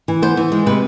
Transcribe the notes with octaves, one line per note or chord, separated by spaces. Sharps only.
E3
B3 C5
E3
G#3
C3 B4